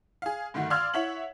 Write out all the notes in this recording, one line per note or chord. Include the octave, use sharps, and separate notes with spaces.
G#4 F5
G2 D3 D#3 A3 F#4
D5 F5 C6 E6 F6 G#6
E4 C#5 E5 F#5 F#7